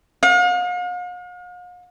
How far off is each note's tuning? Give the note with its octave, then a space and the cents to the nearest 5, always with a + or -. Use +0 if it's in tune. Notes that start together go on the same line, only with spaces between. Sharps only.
F5 +45